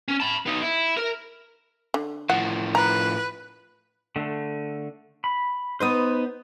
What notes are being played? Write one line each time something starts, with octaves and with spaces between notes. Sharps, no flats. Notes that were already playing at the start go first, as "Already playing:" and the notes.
C#4
A5 B5
B3 D#4
E4
A#4
D3
A2 F3 F#5
B4 A#5
D3 A3
B5
B3 D#4 B4 C5 D#6